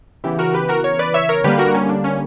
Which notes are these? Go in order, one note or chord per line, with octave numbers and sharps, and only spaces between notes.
C#3 E3 B3 E4 G4
F#4 A#4
G4 B4
F#4 A#4
A#4 C#5
B4 D5
C#5 E5
A#4 C#5
D3 G3 A#3 G4 B4
F#4 A#4
C#4
D4
C#4